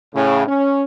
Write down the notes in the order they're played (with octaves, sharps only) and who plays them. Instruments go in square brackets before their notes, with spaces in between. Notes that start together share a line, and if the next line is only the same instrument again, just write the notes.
[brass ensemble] A2 C#3
C#4